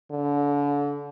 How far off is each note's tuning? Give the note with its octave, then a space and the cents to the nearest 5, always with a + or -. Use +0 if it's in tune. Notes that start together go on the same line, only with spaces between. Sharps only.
D3 -30